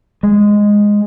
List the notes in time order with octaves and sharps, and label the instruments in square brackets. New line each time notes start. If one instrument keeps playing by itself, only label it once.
[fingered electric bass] G#3